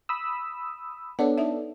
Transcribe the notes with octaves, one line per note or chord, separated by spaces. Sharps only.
B5 D#6 E6
B3 D4 A4 C#5 F#5
D#4 D5 E5